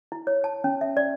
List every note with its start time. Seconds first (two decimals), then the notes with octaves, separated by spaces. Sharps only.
0.12 E4
0.27 C#5
0.44 A5
0.64 C#4
0.81 E5
0.97 D5